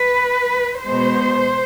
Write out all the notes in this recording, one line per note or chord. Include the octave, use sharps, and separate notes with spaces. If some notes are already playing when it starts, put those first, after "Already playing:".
Already playing: B4
B2 G#3 B3 C5